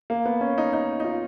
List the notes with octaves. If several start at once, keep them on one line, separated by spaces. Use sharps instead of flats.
A#3
B3
C#4
D#4
D#4
D#4
F4